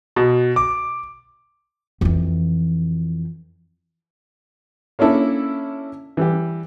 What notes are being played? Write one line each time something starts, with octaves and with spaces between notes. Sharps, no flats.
B2
D6
F2 E3
A#3 C#4 D4 E4 A4
E3 G3 G4